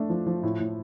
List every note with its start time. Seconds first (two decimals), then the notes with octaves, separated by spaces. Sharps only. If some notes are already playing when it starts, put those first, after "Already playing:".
Already playing: A3 D4
0.09 F3
0.26 F3
0.43 A2
0.60 A2